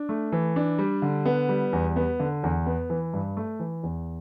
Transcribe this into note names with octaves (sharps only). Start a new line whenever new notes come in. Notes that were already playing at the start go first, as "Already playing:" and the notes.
Already playing: D4
A3
E3
D4
G3
D3
B3
G3
E2
B3
D3
E2
B3
E3
G2
A3
E3
E2